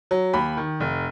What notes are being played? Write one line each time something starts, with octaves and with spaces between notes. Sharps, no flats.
F#3
D#2 B5
D#3
F1